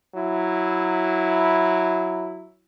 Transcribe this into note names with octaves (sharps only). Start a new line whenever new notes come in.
F#3 E4